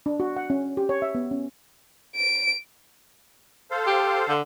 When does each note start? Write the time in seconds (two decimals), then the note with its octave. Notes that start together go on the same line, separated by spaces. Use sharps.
0.06 D4
0.20 F#4
0.36 F#5
0.50 C#4
0.77 G4
0.89 C#5
1.02 E5
1.15 B3
1.31 C#4
2.16 D7
3.71 A4 C5 F5
3.87 G4
4.28 D3